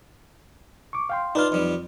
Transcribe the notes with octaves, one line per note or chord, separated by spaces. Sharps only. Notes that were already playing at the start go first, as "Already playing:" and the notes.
C#6 D6
F5 G5 C6
D4 D#4 F4 B4 F6
F2 G3